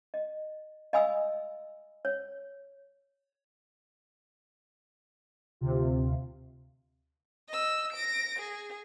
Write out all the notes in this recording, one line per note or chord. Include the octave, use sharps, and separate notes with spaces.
D#5
D#5 F5 G#5 B5 D#6 E6
C#5
D2 C3 F4
D#5 E6
A#6 D7
G#4